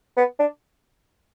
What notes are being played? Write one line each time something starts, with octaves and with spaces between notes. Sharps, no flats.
B3
D4